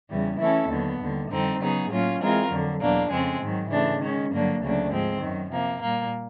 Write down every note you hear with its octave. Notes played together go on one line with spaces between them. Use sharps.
E2 C#3 E3 G3
E3 A3 C#4 E4 A4
D#2 D3 F#3 B3
D#2 D3 G3
F2 D3 G3 C4 D#4
C#3 F#3 B3 D#4 G#4
A2 F#3 A#3 C#4 F4
E3 G#3 C4 F4 A#4
F2 D3 F#3
E2 B2 F#3 A#3 D4
F2 C#3 F3 G#3 C4
G#2 D#3 F#3
C#3 E3 A3 D4
D#3 G#3 C#4
G2 D3 F#3 A#3 D4
D2 C#3 F#3 A#3 D4
G#2 F3 G#3 C4
F#2 D#3 F#3
C3 F3 A#3
A#2 G3 A#3